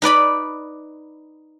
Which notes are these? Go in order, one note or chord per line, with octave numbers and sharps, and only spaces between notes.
D#4 B4 D5 B5